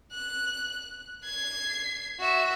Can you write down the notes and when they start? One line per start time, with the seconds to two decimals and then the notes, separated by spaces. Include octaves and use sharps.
0.12 F#6
1.24 G#6 C7
2.20 F#4 E5